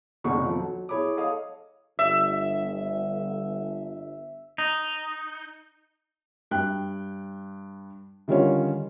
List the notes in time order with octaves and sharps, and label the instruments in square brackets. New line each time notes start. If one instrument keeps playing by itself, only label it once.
[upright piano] F#1 C2 B2 D#3 F#5 C#6
F2 F3
F#3
E4 G#4 C#5 B5 D6
A4 C#5 D#5 F5 D#6
[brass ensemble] G1 [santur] E5
[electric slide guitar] D#4
[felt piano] G2 G5 F#6
D3 D#3 G3 C#4 F4 C#5